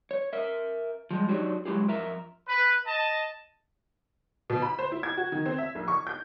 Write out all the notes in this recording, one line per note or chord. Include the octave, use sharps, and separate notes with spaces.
C#5
A#4 E5
F3 G3 G#3
F#3 D4 D#4 F#4 G4 C#5
F#3 G#3 E4 G4 G#4
F2 A#4 E5 A#5
B4
D#5 A5
B2
B5
C5
E4
G#6
F#4
D#3
C4
E5
A#1
C#6
G6